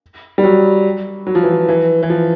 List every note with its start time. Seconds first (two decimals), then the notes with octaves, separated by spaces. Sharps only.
0.38 G3
0.44 F#3
1.27 F#3
1.35 F3
1.43 E3
1.52 F3
1.68 E3
2.03 E3
2.10 F3